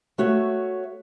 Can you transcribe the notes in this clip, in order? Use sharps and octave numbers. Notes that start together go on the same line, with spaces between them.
A3 F#4 C#5 E5